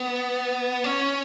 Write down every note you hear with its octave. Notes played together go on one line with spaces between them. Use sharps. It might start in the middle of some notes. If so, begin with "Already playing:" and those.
Already playing: B3
C#4